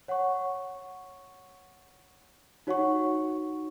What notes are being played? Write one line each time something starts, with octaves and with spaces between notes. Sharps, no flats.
C#5 F#5 C#6
D#4 F#4 C#5 F#5 C#6